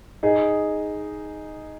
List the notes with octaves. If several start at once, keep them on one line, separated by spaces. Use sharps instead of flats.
D#4 G#4